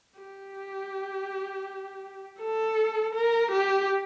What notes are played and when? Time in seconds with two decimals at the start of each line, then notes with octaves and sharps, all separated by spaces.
0.19 G4
2.41 A4
3.15 A#4
3.52 G4